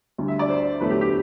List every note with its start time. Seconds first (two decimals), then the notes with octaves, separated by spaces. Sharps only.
0.18 D2 D3 G3
0.28 E5
0.39 D5
0.49 C5
0.80 E2 D3 F#3 A3 B4
0.91 G4
1.01 G4